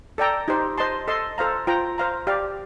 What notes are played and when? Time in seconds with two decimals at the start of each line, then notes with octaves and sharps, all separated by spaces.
0.18 A4 D5 G5 A#5
0.48 D#4 G4 C5
0.78 C5 D#5 A5 C6
1.08 A4 D#5 A5 C6
1.38 A4 C5 F5 A#5
1.67 F4 C5 G5 A#5
1.98 C5 F5 A#5
2.27 G4 D5 F5